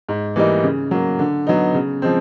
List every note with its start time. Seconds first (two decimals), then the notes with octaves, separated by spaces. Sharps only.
0.09 G#2
0.36 E3 G3 A#3 D#4
0.64 C#3
0.91 F#3 A#3
1.19 D3
1.47 F#3 B3 D#4
1.74 C#3
2.02 F3 G#3 C4